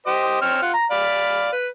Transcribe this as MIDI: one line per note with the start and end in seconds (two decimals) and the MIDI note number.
0.06 0.40 67
0.06 0.40 72
0.06 0.40 75
0.42 0.62 60
0.42 0.62 73
0.42 0.62 89
0.62 0.73 65
0.62 0.73 78
0.74 0.85 82
0.91 1.51 74
0.91 1.51 77
0.91 1.51 83
1.52 1.67 71